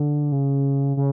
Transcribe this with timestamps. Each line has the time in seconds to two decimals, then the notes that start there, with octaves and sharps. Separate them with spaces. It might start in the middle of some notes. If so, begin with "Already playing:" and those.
Already playing: D3
0.32 C#3
0.97 C#3